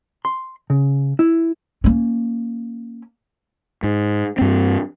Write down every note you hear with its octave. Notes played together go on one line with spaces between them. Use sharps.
C6
C#3
E4
A#3 C#4
G#2
G2 C4